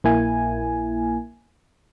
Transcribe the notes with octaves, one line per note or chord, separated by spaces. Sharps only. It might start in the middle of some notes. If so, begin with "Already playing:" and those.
A#1 A#3 E4 G#5